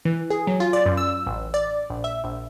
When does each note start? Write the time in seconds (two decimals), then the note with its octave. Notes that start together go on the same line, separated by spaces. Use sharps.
0.05 E3
0.30 G#4
0.47 F#3
0.60 F4
0.73 D5
0.86 F#2
0.97 E6
1.27 A1
1.54 D5
1.90 A#1
2.04 E5
2.24 A#1